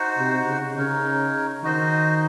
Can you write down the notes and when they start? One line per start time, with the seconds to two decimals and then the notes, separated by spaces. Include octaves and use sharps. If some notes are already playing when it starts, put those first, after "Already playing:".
Already playing: D#4 F#4 C5 F#5
0.17 C3
0.46 C#3
0.76 C#3 D#4 A#4 C#5
1.64 D#3 D#4 F#4 C5 D#5